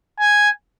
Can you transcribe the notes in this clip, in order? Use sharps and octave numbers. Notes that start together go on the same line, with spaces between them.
G#5